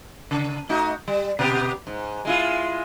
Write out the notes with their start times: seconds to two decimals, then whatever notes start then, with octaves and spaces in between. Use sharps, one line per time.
0.31 C#3
0.69 A3 D#4 F#4
1.08 G3
1.39 B2 B3 G4
1.87 G#2
2.25 G#3 E4 F4